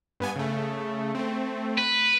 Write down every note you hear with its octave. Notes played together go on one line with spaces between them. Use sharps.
G2 B3 G#5
C#3 A3
A3 C4
B4